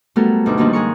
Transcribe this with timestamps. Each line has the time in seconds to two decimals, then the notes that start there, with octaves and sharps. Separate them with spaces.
0.16 F#3 G3 A3 B3 A4 A#4
0.46 D2 G2 B2 D#4 D6
0.58 D#3 F3 G3 A#3 D4 D#4
0.73 G#2 G#4 A#4 C#6